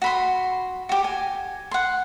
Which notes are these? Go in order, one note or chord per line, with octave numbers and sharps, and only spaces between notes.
F#4 B5 C6
F#4 G4
G#5
F#5 C6